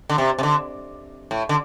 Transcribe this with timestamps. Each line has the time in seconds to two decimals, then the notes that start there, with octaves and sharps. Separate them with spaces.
0.10 D3
0.18 C3
0.39 C3
0.43 D3
1.31 A2
1.49 D3